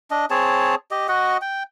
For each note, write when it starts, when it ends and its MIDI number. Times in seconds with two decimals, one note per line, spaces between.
0.11 0.25 62
0.11 0.25 75
0.30 0.75 60
0.30 0.75 68
0.30 0.75 73
0.30 0.75 81
0.91 1.07 67
0.91 1.07 75
1.08 1.37 66
1.08 1.37 75
1.08 1.37 78
1.42 1.63 79